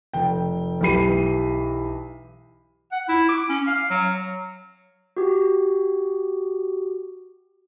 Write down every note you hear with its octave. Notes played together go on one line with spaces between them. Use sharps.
F1 G5
B1 E3 G4 B5 C7 D#7
F#5
E4
D6
C#4
F5
F#3
F#4 G4